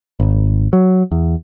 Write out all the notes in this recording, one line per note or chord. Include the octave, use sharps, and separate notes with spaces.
G#1
F#3
E2